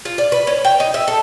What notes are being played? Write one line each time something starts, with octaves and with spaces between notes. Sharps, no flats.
F4
D5
B4
C#4
G5
D#4
E5
A4